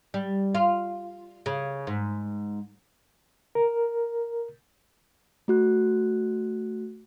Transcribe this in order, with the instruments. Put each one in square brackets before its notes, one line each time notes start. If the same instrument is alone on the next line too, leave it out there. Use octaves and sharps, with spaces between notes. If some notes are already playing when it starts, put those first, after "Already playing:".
[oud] G3
F4
C#3
G#2
[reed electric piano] A#4
[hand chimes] A3 F#4 F#6